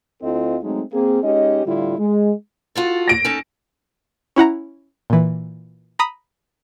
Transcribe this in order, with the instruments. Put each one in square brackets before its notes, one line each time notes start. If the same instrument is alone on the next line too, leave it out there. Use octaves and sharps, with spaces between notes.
[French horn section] D2 C4 E4 F4 A4 D#5
F#3 G#3 A3 C4 D#4
A#3 C4 G#4
G#3 C#4 D#4 G4 D#5
A2 D3 G3 E4 F4
G#3
[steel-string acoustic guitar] F4 F#4 A4
[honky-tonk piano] A#6 D7
[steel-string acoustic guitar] C#4 D#4 A4
[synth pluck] C#4 E4 F#5 A#5
A#2 E3
A#5 B5 D#6